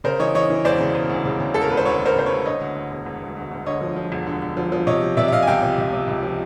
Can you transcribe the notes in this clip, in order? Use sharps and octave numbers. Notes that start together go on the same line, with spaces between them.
C#3 A#4 C5
E3 C#5 D#5
E3 C#5 D#5
E3
E1 C5 D5
C#3
E1
D2
C#3
C#3
E1 A4
A#4
D2 B4
C5
D2 B4 C#5
E1
A#4 C5
C#3 C5
D2 B4 C#5
D3 C#5 D#5
D2
D2
E1
E1
D2
D2
D2
D3 C#5 D#5
F3
F3
E1
D3
D3
F3
F3
C3 C#5 D#5
F3
C3 D5 E5
E5
C3 D#5 F5
G#5
C#2 F5 G5
C3
C#2
C3
C#2
F3